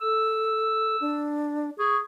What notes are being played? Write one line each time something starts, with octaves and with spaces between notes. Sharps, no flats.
A4 E6
D4
G#4 C#6